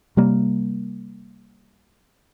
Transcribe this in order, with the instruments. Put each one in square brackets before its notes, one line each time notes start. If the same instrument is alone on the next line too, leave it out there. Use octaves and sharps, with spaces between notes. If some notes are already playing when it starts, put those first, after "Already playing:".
[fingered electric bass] C3 G3 A#3